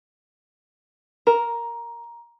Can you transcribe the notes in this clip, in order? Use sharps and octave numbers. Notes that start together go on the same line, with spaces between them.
A#4 A#5